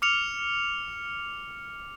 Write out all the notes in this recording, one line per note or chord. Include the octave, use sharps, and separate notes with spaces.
D6 F6 C#7 F7